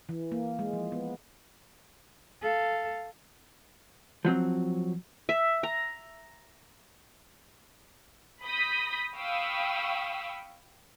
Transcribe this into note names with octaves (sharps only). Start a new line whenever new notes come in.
E3
A#3
G#3
F3
B3
A4 F5
F3 F#3 C4
E5
A#5
B5 D#6 G6 A#6 B6
F5 G5 B5 C#6 D#6 E6